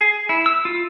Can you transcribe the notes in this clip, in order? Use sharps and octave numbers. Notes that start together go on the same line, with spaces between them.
G#4
E4
E6
F4